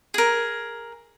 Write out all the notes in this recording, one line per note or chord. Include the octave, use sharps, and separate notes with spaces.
G#4 A#4